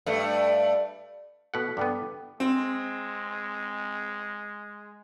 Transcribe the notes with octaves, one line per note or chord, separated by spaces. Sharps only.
G2 A3
B2 A4 F#5 F#6 B6
G2 G3 B3 A4 G5 D6
G#3 C4